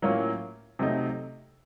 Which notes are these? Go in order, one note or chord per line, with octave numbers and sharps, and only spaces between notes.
A2 F#3 A#3 C#4 F4
C3 F#3 A3 D#4